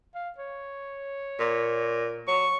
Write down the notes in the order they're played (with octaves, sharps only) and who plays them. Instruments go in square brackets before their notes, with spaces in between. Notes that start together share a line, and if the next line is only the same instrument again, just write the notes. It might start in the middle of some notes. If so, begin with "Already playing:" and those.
[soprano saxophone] F5
C#5
[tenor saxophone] A#2
[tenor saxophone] F#3 [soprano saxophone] C#6